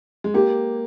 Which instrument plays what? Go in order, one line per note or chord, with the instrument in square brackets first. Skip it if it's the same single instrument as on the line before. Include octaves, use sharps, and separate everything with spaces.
[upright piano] G#3
[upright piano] A#3 [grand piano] G4